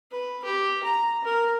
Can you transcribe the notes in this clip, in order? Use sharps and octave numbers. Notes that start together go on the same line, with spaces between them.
B4
G4
A#5
A#4